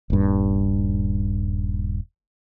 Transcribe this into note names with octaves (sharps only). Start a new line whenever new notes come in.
D#1 G2